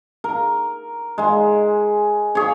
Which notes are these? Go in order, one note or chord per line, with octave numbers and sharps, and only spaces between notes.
A#4
G#3 G#5
G#4 C#5